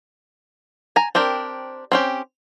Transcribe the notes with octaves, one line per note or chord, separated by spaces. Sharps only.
G#5 A#5
C4 D4 G4 A#4
C4 C#4 G4